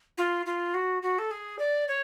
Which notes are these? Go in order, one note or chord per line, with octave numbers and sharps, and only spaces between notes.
F4
F4
F#4
F#4
A4
G#4
D5
C#5